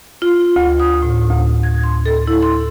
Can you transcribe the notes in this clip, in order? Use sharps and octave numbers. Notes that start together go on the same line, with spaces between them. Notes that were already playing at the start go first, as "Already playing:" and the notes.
F4
D2
D#6
A2
D2
G#6
C6
A4
E4
C6